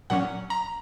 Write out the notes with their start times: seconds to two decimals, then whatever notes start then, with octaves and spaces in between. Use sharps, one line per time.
0.10 A#2 F#3 C#4 F#5
0.50 A#5